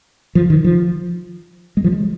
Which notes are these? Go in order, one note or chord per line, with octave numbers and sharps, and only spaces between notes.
F3
D#3
F3
G#3
F3
G#3